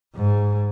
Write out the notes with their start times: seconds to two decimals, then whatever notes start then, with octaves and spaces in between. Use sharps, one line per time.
0.16 G#2